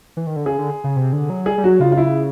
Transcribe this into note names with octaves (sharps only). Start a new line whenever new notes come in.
E3
D#3
D3
C#3 G#4
D3
C#3
C3
D3
F#3
G3 G#4
G3
F#3 F#4
C#3 F4
F4
E4